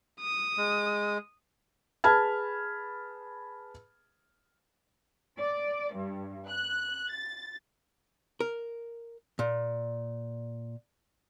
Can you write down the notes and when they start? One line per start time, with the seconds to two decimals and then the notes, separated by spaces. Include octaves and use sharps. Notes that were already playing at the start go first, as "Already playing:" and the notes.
0.20 D#6
0.58 G#3
2.04 G#4 B4 A5 B5 F6 G#6
5.38 D5
5.94 G2
6.48 F#6
7.10 A6
8.40 A#4
9.39 A#2